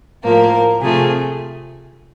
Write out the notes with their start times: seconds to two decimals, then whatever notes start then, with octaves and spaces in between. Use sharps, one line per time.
0.23 A2 F3 A#3 A#4
0.80 C3 F3 A3 G#4